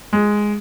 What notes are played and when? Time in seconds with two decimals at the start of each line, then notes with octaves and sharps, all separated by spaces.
0.13 G#3